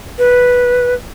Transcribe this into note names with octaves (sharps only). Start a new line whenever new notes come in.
B4